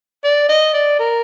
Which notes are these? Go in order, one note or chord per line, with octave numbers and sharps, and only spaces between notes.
D5
D#5
D5
A#4